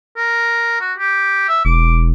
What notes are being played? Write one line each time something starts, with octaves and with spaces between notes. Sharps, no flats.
A#4
F#4
G4
E5
E1 D6